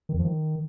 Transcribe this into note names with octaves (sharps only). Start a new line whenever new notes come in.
D#3
E2
F3
D#3